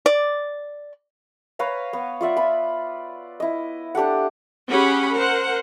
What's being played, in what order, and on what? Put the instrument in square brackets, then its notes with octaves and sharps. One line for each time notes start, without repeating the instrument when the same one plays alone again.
[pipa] D5
[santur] B4 C#5 F5 A#5
B3
F4 D5 E5 F#5
F4 B5
E4 D#5
D4 G4 A4 F#5
[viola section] C#4 G4 G#4 F#5 B5
A#4 C5 F#5